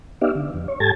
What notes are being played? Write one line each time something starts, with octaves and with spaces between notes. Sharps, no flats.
B3 D#4 G4 D5 E5 F5
D3
F2
C#5
G#2 G4 A4 A5 G#6 A6